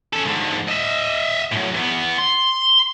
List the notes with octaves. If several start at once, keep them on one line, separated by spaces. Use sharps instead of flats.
C#4 A4
G#2 D3
D#5 E5
A2 F#3
E3 B3
C6